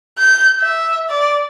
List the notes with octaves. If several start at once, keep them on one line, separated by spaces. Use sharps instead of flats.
G6
E5
D5